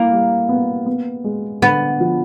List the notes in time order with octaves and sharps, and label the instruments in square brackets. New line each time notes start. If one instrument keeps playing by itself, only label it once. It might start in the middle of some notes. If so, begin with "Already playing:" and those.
Already playing: [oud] A#3 [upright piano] E4
[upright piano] G3
B3
B3
G#3
[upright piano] D3 [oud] B3
[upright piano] F3